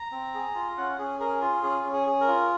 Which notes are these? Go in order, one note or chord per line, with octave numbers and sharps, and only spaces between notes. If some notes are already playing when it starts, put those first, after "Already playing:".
Already playing: A#5
C4
G#4
F4
C#4 F#5
C#4 G#4
G#4 A#4
F4
C#4 G#4
C#4
G#4
G#4
A#4
F4